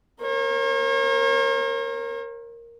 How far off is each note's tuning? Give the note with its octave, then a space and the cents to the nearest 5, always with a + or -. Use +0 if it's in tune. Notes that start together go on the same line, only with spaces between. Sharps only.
A#4 +0 C#5 -45